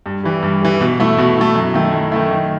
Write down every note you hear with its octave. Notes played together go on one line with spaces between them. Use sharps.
G2
E3 G3
G2
E3 G3
B2
A3 E4
B2
A3 E4
F#2
D#3 A3 E4
F#2
D#3 A3 E4
D#3